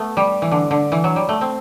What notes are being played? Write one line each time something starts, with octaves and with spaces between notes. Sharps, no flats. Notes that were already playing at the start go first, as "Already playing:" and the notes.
Already playing: A3 B3
G3
E3
D3
D3
E3
F#3
G3
A3
C4